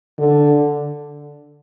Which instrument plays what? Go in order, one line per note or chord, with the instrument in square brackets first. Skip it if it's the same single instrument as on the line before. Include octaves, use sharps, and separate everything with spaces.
[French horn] D3